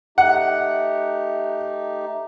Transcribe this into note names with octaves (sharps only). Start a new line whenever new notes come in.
A3 D#4 G4 F#5